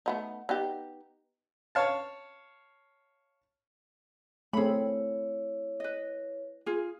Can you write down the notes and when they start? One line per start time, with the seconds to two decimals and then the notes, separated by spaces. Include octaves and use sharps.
0.06 A3 B3 D#4
0.49 B3 D#4 G4
1.75 C#5 F5 A5
4.53 A3 C4 E4 G#4 C#5 B5
5.80 B4 D#5
6.66 F4 G#4